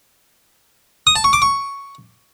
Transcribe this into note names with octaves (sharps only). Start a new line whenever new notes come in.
D#6
A5
C#6
D6
C#6